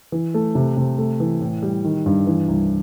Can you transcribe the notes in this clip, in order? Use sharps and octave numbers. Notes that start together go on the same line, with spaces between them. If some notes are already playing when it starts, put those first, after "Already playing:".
E3
A3
C3
C3
A3
E3
A2
G3
D#3
G2
E3
C2